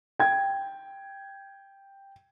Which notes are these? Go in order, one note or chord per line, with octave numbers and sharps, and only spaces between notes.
G5 G#6